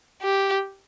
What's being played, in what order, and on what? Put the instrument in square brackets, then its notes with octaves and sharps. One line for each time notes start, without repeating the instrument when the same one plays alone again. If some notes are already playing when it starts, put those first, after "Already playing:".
[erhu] G4